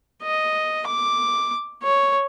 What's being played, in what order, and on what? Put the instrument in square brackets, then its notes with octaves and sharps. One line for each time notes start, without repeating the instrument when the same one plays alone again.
[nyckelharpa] D#5
D6
C#5